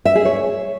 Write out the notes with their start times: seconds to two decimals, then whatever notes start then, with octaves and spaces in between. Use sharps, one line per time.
0.05 E5
0.15 G#4
0.25 C#5